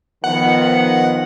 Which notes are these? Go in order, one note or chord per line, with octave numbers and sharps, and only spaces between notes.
D#3 F3 B3 F#5